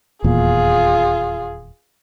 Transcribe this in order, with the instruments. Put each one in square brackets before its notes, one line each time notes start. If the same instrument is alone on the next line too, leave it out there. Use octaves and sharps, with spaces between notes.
[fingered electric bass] D#1 E2 A#2 [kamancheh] F4 G#4